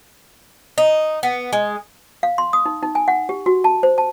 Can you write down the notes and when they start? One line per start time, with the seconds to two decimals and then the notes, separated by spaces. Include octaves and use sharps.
0.78 D#4
1.23 B3
1.53 G#3
2.23 F5
2.38 C6
2.53 D#6
2.66 D#4
2.83 D#4
2.95 G#5
3.08 F#5
3.29 G4
3.46 F#4
3.64 A5
3.83 C5
3.98 A5